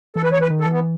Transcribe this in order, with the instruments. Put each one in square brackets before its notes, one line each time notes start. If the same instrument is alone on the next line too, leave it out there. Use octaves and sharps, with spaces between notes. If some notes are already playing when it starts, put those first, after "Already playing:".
[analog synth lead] E3 [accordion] A4
[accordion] B4
C#5
B4
[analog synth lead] D#3
[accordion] A4
[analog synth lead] E3
[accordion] B3